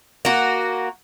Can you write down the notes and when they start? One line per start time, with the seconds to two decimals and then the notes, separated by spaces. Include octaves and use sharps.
0.25 A#3 F#4